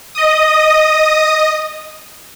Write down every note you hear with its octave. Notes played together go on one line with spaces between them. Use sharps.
D#5 D#6